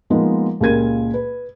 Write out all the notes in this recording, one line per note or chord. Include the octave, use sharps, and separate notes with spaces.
F3 G#3 A#3 B3 D#4 F4
C#2 A#2 G4 A#4 G#6 D#7
B4